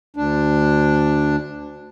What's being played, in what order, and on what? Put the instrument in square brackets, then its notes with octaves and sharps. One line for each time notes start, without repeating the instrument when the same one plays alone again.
[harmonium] D2 D4